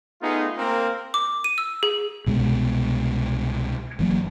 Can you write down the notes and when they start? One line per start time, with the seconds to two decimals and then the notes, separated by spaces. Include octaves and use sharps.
0.22 A3 B3 D#4 F4 G#4
0.57 A#3 C4 A#4
1.14 D6
1.44 D#7
1.58 E6
1.83 G#4
2.26 C2 B2 G#3 B3
3.99 G1 E3 F#3 A#3